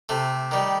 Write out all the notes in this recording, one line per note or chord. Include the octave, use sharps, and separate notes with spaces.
C3 A3
D#3 G3